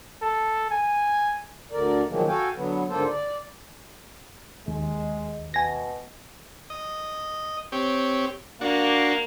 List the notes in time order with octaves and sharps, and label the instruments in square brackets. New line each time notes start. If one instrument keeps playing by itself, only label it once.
[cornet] A4
G#5
[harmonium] D2 D3 A#4 D5
B2 D#3 F3 F#3 G#3 A#3
F#4 A4 F5 G5 G#5
D3 F#3 B3
G#2 D3 A#3 F4 A4 C5
D5
[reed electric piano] D#2 [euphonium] G#3
[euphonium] B2 [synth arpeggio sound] G#5 A#6
[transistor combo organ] D#5
C4 G4 C#5
[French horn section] A#3 [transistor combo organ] D4 F#4